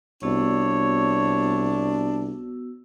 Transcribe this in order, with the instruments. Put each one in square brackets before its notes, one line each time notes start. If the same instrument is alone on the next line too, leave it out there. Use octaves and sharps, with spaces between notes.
[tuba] C2 [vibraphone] B3 F#4 E6 [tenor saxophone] D4 [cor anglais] C#5